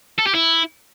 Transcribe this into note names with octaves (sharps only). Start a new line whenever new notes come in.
A4
G4
E4